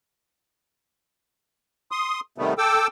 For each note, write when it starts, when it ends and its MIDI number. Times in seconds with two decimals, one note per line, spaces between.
1.91 2.20 84
1.91 2.20 87
2.38 2.54 48
2.38 2.54 51
2.38 2.54 55
2.38 2.54 57
2.38 2.54 59
2.58 2.87 69
2.58 2.87 79
2.58 2.87 86
2.58 2.87 88